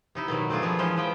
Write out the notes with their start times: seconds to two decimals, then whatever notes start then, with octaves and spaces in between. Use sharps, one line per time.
0.15 C3 D#4 E4
0.28 B2 D#3 F#3
0.50 A3 C4 D4 F4 G#4
0.62 F3 A#3 B3 G#4
0.78 E3 F3 G#3 C#4 C5
0.97 F3 B3 G5